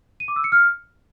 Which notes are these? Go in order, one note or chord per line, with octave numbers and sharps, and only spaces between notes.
D#7
D6
E6
C#7
F6